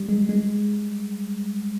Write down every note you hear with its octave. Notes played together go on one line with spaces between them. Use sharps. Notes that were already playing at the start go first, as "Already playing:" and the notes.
Already playing: G3
G#3
G#3